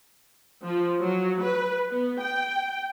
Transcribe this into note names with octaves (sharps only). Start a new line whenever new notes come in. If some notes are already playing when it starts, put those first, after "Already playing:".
F3
F#3
B4
B3
G5